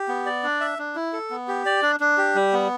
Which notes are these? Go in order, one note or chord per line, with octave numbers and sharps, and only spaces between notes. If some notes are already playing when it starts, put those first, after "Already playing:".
Already playing: G4
B3
D5
D4
E5
D4
E4
A4
B3
G4
D5
D4
D4
G4
G3
B3